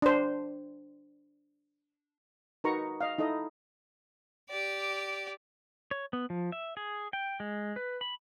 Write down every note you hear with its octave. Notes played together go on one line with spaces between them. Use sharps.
D4 C5
D#4 F#4 A#4 B4 A#5 C#6
D#5 F5
D#4 E4 A4 D#5
G4 D5
C#5
B3
F3
E5
G#4
G5
G#3
B4
B5